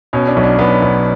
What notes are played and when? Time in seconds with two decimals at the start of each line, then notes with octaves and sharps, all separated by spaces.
0.13 B2 C#4
0.28 D4
0.36 B1
0.44 D4
0.58 B1 B3
0.82 B1